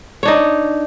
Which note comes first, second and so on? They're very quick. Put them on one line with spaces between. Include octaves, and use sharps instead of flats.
C#5 D4 D#4